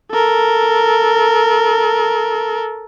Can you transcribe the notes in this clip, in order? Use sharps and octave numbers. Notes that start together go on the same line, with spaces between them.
A4 A#4